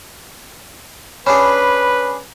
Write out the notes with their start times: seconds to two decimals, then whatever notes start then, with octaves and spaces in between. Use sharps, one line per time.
1.27 C#4 D4 G#4 B4 C#5 B5